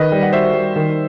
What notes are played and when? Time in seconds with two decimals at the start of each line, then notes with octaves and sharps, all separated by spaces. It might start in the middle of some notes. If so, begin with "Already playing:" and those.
Already playing: D#3 B4 D#5
0.12 G3
0.23 F#5
0.33 F#4 C5 E5
0.53 G3
0.76 D#3